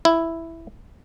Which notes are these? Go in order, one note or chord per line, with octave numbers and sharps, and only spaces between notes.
E4